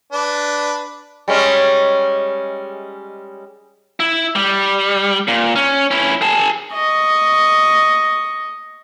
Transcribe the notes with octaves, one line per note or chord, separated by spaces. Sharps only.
D4 B4
G3 G#3 C#4
E4
G3
A#2
C#4
C#4 E4
G#4 A5
D#5 C#6